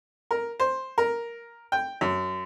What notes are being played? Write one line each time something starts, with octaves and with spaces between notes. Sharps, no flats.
A#4
C5
A#4
G5
F#2